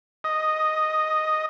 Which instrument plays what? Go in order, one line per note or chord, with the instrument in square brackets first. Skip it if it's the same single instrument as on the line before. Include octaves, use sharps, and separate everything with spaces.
[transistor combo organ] D#5